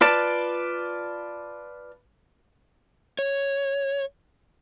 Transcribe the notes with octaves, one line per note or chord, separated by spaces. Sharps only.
F4 B4 D5 A5
C#5